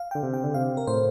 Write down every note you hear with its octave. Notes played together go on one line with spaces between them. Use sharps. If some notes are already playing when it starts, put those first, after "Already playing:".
Already playing: F5
D3 G5
C3
G5
D3
C3 F5
A#4
A2 C5